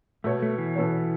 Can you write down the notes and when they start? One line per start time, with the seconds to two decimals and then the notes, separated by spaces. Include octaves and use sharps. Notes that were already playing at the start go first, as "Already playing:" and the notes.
0.24 B2 A3 B3 A4 C#5
0.42 A3
0.58 E3
0.76 B2 B3 A4 C#5